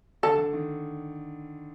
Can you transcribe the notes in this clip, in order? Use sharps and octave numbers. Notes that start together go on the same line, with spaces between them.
D3 A4
D3
D#3